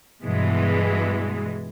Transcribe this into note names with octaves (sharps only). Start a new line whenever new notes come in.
G2 B2 E3 G#3